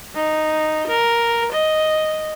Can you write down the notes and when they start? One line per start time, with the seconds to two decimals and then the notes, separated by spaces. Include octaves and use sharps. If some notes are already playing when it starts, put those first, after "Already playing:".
0.14 D#4
0.87 A#4
1.52 D#5